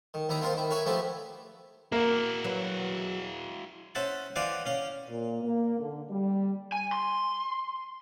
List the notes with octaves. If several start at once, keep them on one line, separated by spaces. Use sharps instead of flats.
D#3
D#2 D#3 E4 A#5 D#6
A#3 C4 D#4 F4 A#4 C5
D#3 E4
A#4 B4 C#5 E5 G#5
F3 A3 B3 C4 E4 G4
A#3 E4 F#4
F#3 B4
C#4 C5 E5 F#5 A5
E3 C5 D5 F5 F#5 G#5
C#4 F5
A#2
A#3
D3
G3
G#5
C6